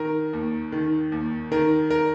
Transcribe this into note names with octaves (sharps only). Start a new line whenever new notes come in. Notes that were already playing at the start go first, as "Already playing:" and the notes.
Already playing: D#3 A#4
D#2
D#3
D#2
D#3 A#4
A#4